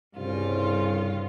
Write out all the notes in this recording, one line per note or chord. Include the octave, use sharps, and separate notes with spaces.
C2 G2 C#3 F4